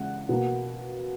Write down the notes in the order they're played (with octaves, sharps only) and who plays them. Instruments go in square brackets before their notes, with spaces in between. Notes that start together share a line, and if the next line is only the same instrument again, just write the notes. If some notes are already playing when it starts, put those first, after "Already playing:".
Already playing: [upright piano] C#3 G#3 F#5
B2 A#3